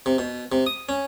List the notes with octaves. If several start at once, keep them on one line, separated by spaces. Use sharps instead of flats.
C3
B2
C3
D#6
C#4